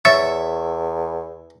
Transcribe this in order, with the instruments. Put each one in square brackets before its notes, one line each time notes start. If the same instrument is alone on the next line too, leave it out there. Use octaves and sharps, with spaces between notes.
[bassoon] E2 [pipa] C#5 [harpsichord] E5 [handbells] E6 A6 C#7